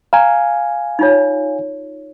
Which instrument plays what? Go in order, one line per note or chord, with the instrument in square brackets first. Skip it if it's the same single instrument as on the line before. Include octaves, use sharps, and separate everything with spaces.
[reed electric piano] F5 G#5 [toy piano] A#5
[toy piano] D#4 F4 C#5